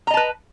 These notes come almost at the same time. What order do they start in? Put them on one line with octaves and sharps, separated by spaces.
A#5 D#5 A5 B4